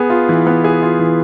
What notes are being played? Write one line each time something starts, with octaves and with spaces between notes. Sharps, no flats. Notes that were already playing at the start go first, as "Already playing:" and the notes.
Already playing: B3 G#4
F4
E3
B3
G#4
F4
E3